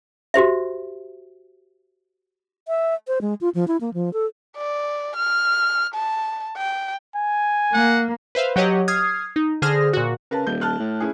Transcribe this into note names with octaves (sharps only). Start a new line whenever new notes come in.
F#4 G4 C5 E5
E5
C5
G#3
F4
F3
E4
A#3
F3
A4
D5
F6
A5
G5
G#5
A#3 F#5
B4 C5 E5 F5
F#3 G4 C#5 D#5 F#5
D#6 F6 G#6 C7
D#4
D3 G#4 C5 D#6 F6 A#6
A#2 F#4
C#3 A#4 B4 A5
D#1 G6
A5 F6 F#6
A2
C#4 E4 G#4